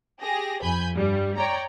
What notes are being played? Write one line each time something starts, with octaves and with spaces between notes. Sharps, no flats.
G4 G#4 A#6
F2 G#5 B5 G6
G2 G3
C#5 D5 G5 A#5